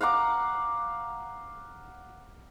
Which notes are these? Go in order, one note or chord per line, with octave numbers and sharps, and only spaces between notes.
F5 F#5 A#5 D6